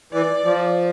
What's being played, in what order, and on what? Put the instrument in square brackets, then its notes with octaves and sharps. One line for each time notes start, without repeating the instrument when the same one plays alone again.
[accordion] E3 [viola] D5
[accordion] F3